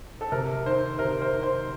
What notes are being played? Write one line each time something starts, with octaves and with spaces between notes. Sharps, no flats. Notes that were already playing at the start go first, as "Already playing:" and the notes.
A4
C3 A#4
D#3 C5
C3 A#4
C5
D#3
C5